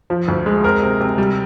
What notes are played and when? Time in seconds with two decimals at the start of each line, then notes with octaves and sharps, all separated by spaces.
0.10 F3
0.28 D2
0.46 G#3
0.64 C4 A#4
0.82 C3
1.00 C3
1.18 G3